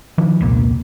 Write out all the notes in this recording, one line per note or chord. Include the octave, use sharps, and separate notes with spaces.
D#3 F3 D4
E1 C2 A#2